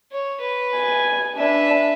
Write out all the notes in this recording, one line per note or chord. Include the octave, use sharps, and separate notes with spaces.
C#5
B4
G#5
D4 B4 E5